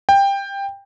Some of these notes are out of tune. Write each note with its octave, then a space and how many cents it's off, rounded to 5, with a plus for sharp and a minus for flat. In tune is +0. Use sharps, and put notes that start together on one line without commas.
G5 +15